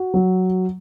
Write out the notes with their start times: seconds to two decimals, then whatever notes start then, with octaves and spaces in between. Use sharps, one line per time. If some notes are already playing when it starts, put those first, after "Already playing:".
Already playing: F#4
0.14 F#3